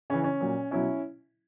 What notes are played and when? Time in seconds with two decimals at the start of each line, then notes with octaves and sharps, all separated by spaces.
0.10 C#3 C#4
0.14 E3
0.24 C#4
0.40 A#2 F#3
0.71 B2 F#3 C#4 E4